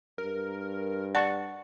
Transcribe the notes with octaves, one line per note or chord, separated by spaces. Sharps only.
G2 A#4
D5 F#5 A5 C#6